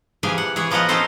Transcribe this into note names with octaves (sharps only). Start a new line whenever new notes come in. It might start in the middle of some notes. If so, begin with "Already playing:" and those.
C3 E3 F3 G4 G#4 G#5
F#5
E3 G#4 C#5
A#2 F3 B3 A#4 D#5 F#5
C4 C#4 D#4 F4 A4 C5